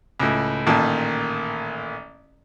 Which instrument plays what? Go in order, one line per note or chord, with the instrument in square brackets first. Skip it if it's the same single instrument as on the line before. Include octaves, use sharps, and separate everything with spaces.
[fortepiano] C#2 A2
A1 A#2 D#3 A5